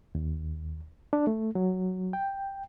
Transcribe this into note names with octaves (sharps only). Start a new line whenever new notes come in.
D#2
D4
A3
F#3
G5